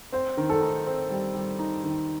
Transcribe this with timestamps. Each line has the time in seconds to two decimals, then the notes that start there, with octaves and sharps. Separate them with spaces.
0.12 C4 C5
0.37 D#3
0.49 A4
0.62 D#4
0.87 C4
1.10 G3
1.35 G3
1.59 D#4
1.84 D#3